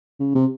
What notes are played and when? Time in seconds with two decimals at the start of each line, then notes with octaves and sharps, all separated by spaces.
0.20 C#3
0.35 C3